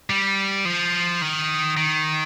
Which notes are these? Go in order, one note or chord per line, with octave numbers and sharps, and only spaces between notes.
G3
F3
D#3
D#3